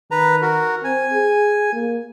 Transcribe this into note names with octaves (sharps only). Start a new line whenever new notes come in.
D#3 B4 A#5
F#4 A#4
C4 G#5
G#4
A#3